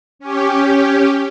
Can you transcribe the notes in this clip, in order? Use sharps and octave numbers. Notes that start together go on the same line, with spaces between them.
C#4 G4